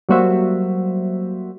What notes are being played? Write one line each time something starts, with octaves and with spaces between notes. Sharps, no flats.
F#3 G3 A#3 F#4 C5 E5